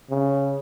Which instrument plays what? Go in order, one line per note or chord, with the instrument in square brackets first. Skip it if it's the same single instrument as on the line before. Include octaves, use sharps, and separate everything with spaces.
[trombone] C#3